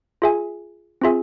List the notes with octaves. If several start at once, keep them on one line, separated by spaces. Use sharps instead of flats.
F4 G#4 E5 G#5
C4 F4 G#4 E5 G#5